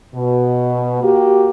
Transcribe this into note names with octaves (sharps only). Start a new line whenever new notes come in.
B2
A#3 F#4 G4